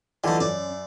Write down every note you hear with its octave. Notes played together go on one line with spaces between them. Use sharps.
D3 E3 F3 A3 D#5
F#2 C#4 D5